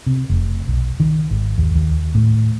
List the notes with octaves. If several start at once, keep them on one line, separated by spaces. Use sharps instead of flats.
C3
F1
B1
D#3
G#1
D#2
D#2
A2